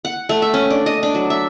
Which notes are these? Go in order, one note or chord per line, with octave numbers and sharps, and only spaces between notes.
F#5
A3
E5
C#4
D4
D#5
D4
F#3
E5